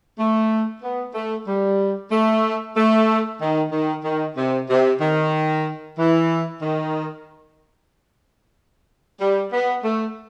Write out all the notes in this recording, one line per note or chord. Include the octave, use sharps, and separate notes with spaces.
A3
B3
A3
G3
A3
A3
D#3
D#3
D#3
C3
C3
D#3
E3
D#3
G3
B3
A3